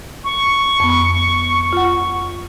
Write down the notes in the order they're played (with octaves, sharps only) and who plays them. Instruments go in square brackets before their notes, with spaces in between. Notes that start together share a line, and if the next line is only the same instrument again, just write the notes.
[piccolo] C#6
[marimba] F2 B3
F4 F#5